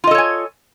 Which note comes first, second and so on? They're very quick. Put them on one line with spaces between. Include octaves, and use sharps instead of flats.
F4 D#5 A4 C#5 G#5